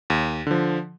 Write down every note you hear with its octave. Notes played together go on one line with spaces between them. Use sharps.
D#2
D3 F3